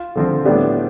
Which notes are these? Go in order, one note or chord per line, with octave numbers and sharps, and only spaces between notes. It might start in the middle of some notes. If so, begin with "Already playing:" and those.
Already playing: F4
D3 F3 C4 F4
A2 G3 B3 D4 G4